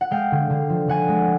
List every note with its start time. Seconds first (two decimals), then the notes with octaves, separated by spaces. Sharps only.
0.01 F#5
0.11 G#3 F5 G5
0.32 D3
0.50 D3
0.70 F3
0.88 D3 F#5 G#5
1.08 G#3